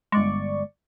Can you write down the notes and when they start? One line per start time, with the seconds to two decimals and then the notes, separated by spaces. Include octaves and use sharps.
0.12 G1 G#3 D5 C#6